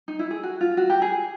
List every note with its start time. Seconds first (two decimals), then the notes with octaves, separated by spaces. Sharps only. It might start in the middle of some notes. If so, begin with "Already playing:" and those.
0.08 D#4
0.19 E4
0.31 G#4
0.43 F#4
0.61 F4
0.77 F#4
0.90 G4
1.02 G#4